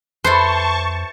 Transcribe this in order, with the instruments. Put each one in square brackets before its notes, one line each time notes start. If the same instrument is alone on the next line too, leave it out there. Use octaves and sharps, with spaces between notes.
[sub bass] F2 [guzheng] E4 A4 B4 [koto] C5 [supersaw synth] A5 C#6